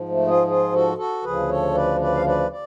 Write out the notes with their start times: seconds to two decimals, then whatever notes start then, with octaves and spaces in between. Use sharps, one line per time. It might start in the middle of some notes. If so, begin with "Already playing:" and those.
Already playing: G#2 F3
0.09 A3
0.27 F4 G#4
0.47 F4 G#4
0.73 F#4 A4
0.97 F#4 A4
1.24 D2 C#3 F3 G#4 B4
1.49 A4 C#5
1.75 B4 D5
2.00 B4 D5
2.15 F5
2.26 B4 D5
2.51 D5